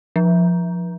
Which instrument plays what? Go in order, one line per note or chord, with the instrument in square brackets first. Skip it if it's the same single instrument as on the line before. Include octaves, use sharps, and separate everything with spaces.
[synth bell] F3